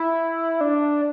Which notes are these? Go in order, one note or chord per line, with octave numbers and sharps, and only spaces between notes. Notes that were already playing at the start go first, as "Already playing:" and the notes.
Already playing: E4
D4